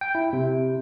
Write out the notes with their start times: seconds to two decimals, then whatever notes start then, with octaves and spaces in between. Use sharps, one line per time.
0.01 G5
0.15 E4
0.33 C3